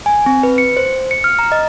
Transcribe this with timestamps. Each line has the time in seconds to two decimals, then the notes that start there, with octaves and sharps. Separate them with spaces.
0.06 G#5
0.26 C4
0.43 B4
0.58 C#7
0.77 C5
1.11 C#7
1.24 F6
1.39 A#5
1.52 D#5